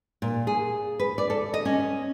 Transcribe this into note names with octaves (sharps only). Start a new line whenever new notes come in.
A#2
G#4
B4
D5
A4
D#5
C#4